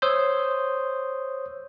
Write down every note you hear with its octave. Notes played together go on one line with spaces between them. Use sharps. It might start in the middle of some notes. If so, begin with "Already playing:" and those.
C5 C#5 C6 D#6 E6 G6